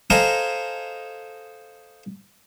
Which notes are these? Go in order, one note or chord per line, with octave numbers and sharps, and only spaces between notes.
A4 C5 D#5 F5 G#5 A#5